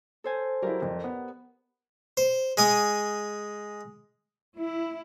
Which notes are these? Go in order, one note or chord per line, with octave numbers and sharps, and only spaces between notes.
A4 C5 G#5
F#3 E4 G4 A#4 D5
F2
B3
C5
G#3 G#5 D#6
E4